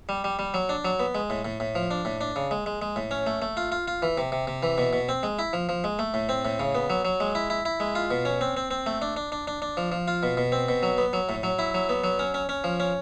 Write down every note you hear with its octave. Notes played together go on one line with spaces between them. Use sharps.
G3
G3
G3
F#3
D4
F#3
B3
G#3
A2
A2
A2
F3
D4
A2
D4
C#3
G#3
G#3
G#3
A2
C#4
A3
A3
F4
F4
F4
E3
C3
C3
C3
E3
B2
B2
C4
G#3
E4
F3
F3
G#3
A3
A2
C4
A2
C#3
B3
F#3
F#3
G#3
E4
E4
E4
G#3
F4
B2
C#4
C4
C4
C4
A3
D4
D4
D4
D4
D4
F3
F3
F4
B2
B2
C4
B2
F#3
B3
F#3
A2
F#3
E4
F#3
B3
F#3
C#4
C#4
C#4
F3
C#4